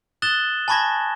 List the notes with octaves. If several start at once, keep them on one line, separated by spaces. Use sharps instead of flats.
D#6 F#6 A6 E7 F#7 G7
G#5 A5 B5 C#6 G#6 A#6